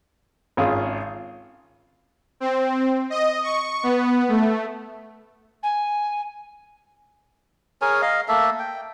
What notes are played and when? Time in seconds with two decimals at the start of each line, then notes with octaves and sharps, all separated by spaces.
0.57 G#1 C#4 F4 G#4
2.40 C4
3.10 D#5
3.43 C#6
3.83 B3
4.29 A3
5.63 G#5
7.82 G#4 A#4 C#5 G#5
8.02 D#5 F5
8.28 A3 A#3 A4 E5
8.59 G5